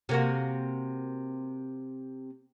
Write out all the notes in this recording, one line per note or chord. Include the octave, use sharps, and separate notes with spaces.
C3 A#3 F#4